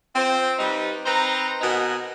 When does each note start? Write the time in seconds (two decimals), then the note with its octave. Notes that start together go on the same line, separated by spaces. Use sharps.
0.16 C4 F4 C5
0.59 G3 D#4 B4
1.06 C4 D#4 B4 C5 A#5
1.61 B2 D#3 B3 D#4 F#5 G#5